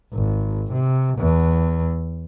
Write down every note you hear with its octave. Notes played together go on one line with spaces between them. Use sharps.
G#1
C3
E2